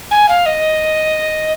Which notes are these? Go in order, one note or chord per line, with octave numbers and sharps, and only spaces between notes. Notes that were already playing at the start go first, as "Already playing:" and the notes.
G#5
F5
D#5